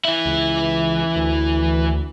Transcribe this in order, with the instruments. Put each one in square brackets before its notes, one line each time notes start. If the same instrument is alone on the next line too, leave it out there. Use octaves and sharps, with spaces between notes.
[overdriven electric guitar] E3 E4
[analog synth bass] C#2
D2